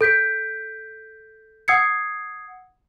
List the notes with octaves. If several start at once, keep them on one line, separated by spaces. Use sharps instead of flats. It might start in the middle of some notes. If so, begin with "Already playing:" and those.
A4 G6 B6 D7
F#5 D#6 E6 G#6 C7 C#7